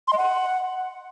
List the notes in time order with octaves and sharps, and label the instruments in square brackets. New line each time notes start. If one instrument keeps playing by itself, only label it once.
[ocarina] C6
D#5
F#5